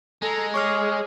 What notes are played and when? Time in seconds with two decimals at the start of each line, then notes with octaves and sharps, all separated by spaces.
0.22 G#3 A4 A#5
0.54 G#4 C#5 C#6 D6 F6